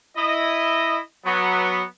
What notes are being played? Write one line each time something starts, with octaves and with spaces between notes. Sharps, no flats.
E4 D#5
F#3 B3